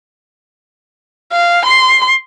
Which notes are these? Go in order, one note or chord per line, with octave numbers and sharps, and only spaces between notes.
F5
C6